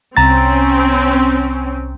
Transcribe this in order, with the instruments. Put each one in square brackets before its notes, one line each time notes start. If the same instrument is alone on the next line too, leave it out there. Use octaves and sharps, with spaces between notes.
[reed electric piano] C2 A#5 A6 [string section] C4 C#4